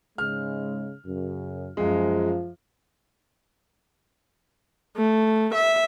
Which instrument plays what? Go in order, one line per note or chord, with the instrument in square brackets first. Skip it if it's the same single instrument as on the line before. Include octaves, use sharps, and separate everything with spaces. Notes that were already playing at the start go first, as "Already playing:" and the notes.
[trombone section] G#2 C#3 G#3 [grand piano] F6
[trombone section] F#2 C#3
[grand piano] F#2 G#3 [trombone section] F3 F4
[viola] A3
E5